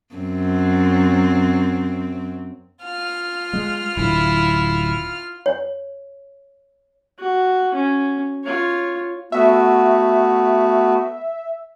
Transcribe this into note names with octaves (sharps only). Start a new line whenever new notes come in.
F#2 C4
F4 F6
G#3
D1 E4
C#5
F#4
C#4
F4 C#5
A3 B3 F#4 E5